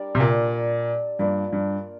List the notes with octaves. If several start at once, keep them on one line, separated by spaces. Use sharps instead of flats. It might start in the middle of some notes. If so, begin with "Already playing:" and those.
Already playing: G3 D4 A#4 D5
C3
A#2
G2 A#3 F4 D5
G2